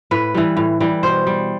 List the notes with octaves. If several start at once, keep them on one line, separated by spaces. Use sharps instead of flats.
A2 B4
E3 G3
A2
E3 G3
B2 C5
G3